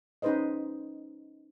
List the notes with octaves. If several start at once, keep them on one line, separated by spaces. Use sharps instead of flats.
C#4 D#4 G#4 B4 C5 D#5